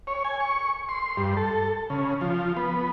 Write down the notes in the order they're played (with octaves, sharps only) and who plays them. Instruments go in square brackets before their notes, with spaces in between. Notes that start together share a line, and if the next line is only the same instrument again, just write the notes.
[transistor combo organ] C#5
G#5
C#6
C6
G2
A4
C#3
F3
B3